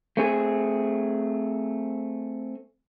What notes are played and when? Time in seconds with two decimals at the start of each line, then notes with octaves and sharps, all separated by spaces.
0.17 A3 C4 G#4